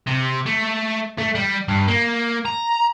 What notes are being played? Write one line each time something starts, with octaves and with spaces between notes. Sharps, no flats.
C3
A3
A3
G3
G2
A#3
A#5